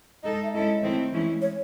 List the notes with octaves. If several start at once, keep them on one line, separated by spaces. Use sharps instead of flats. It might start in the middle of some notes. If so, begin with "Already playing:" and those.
G#3 D#4 A4 D#5
E5
G#3 C#4 E4 A4 D#5
D#3 A3 C4 E4
E3 G#3 C#4 E4
C#5